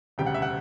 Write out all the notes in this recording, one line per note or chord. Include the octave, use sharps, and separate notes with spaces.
E1 D2 C#3 G3 G5
F#5
E5
F#5